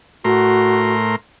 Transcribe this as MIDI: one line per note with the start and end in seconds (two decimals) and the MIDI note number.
0.24 1.16 45
0.24 0.93 66
0.24 1.16 70
0.24 1.16 84